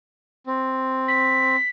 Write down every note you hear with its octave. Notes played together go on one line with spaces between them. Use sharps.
C4
B6